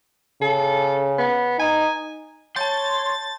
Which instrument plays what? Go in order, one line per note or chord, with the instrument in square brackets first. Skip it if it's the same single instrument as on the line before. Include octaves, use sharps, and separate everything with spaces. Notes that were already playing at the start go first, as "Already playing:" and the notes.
[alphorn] C#3 [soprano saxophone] A4
[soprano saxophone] B3
[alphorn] D#4 [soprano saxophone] G#5
[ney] C#5 [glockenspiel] A5 G6 [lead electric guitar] C6 [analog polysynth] A6